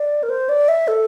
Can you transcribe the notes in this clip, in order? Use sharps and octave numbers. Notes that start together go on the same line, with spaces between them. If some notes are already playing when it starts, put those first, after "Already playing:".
Already playing: D5
A#4
C5
D5
E5
A4